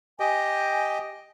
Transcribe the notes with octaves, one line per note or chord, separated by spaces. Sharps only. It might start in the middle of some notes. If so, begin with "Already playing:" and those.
G4 D#5 G5 G#5